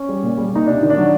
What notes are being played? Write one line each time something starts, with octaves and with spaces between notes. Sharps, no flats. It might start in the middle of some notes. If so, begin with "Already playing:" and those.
Already playing: C#4
G3
A#2
G3
A#2 D#4
C3 D4
D#3
D4
F#3